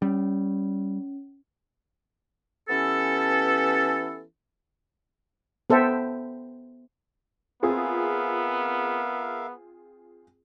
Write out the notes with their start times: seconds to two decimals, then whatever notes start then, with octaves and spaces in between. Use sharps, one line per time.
0.02 G3 C#4
2.69 E3 B3 C#4 G4 A4
5.70 B3 A4 C5 E5 G5
7.63 B3 C4 F4 G#4 A#4 E5 F5